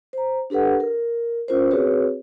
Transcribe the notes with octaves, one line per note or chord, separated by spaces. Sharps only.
C5 A#5
D4 G4 A4 B4 F#5
A#4
C#4 F4 A#4 C5
C4 F#4 G#4 B4 C#5